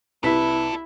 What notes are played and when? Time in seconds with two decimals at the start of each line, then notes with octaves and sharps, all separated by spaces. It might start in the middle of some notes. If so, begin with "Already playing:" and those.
0.23 C2 D4 E4 A4 B4 B6